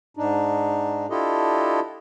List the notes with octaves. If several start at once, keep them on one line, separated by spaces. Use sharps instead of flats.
G#2 D4 D#4
D4 E4 F4 G4 A4 D#5